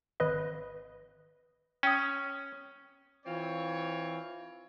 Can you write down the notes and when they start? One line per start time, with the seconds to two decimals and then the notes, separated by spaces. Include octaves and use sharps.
0.20 G#1 B4 D#5
1.83 C#4 G5 D#6
3.26 E3 C4 F4 C#5